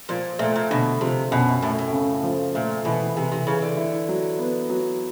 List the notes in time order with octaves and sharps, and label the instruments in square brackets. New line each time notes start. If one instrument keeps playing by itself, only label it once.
[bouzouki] A#2 [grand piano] F3
[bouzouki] A#2 [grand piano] A3
[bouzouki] A#2
[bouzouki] B2 [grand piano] D3
[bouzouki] C3 [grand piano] F3
[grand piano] F#2 [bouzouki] B2
[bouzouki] A2 [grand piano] A3
[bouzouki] A2
[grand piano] C#3
F3
[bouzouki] A#2 [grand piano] A3
[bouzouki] B2 [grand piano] E3
[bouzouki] C3 [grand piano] E3
[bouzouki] C3
[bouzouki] C#3 [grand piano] E3
[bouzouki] D3
[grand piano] E4
F#3
B3
F#3